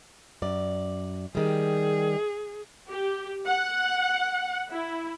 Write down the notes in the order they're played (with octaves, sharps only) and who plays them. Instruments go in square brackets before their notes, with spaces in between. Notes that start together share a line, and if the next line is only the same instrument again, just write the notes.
[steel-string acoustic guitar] F#2 D5
[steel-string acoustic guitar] D#3 G3 [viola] G#4
[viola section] G4
F#5
E4